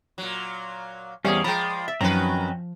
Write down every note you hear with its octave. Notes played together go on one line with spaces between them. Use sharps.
A#2 F#3
E2 G3 A#3 C#4 G#4 C5 E5
F3 G#3 D5 G5 A#5 B5
E5
F#2 D#3 F3 C4 C#4 F#4 B4 A#5